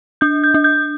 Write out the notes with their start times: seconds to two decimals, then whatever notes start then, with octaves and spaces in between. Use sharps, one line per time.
0.21 D4 G6
0.44 G6
0.54 D4
0.64 G6